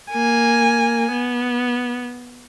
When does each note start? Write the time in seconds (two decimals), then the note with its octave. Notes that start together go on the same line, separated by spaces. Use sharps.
0.12 A#3 G#5
1.13 B3